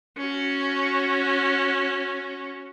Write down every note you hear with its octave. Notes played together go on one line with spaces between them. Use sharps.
C#4 F#4